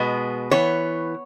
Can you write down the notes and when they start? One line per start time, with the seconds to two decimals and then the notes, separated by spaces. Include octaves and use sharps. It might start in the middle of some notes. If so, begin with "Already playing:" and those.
Already playing: B2 G#3 B3
0.51 E3 B3 C#5